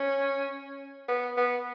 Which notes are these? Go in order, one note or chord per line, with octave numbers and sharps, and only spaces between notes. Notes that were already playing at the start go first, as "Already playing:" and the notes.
Already playing: C#4
B3
B3